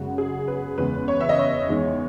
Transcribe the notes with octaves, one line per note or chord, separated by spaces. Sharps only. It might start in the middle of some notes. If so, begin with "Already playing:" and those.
Already playing: F#2 C#3 G#3 F#4
G#4
B4
E2 C#3 G#3 B4
C#5
E5
D#5
C#5
E2 D#3 G#3